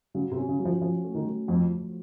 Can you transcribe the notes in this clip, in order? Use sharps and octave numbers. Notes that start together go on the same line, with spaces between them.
C#3 F#3
C3
C#4
C#3
F#3
F3
F3 C#4
A3
D#3
F#3
F2 F3
F3